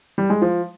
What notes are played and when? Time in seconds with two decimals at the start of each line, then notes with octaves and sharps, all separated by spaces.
0.18 G3
0.30 G#3
0.42 F3